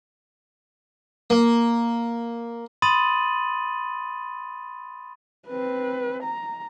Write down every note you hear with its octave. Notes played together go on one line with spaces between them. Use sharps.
A#3
B5 C6 D#6 A6 D#7 F#7
C4 B4
A#5